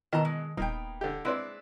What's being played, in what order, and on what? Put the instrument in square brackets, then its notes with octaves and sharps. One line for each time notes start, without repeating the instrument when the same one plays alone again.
[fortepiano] B2 E3 [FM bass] D#3 [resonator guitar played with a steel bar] D#5 A5 A#5
[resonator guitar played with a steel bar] G#3
[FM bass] D#1 [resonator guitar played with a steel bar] A#3 B3 G5 [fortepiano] D#4
[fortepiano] D3 G4
[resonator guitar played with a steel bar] G#3 C4 D4 [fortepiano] E4 B4 D5